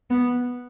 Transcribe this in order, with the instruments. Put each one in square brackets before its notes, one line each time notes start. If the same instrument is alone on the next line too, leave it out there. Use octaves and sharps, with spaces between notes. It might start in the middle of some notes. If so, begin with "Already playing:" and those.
[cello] B3